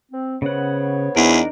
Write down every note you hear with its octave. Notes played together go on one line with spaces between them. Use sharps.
C4
C#3 B3 C5 C#5 F#5
E2 D4 D#4 A#4